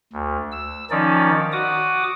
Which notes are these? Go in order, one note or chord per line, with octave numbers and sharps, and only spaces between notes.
D2
E6
D#3 F3 C#4 D#4 D5
F#4 D6 D#6